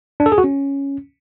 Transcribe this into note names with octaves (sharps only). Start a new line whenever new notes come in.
D4
A4
G#4
F#4
C#4